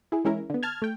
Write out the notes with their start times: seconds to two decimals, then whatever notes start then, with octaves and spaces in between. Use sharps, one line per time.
0.12 E4 G#4
0.24 E3 G#3 C#4 E4 A#4
0.50 D3 B3
0.63 A5 F6 G#6
0.82 A3 G5